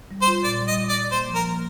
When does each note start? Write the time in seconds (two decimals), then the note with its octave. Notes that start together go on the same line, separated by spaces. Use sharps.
0.11 G3
0.22 C5
0.27 F4
0.44 A#2 D5
0.62 G3
0.67 D#5
0.77 G3
0.89 D5
0.95 A#2
1.12 A#3 C5
1.29 F3
1.35 A#4
1.46 A#3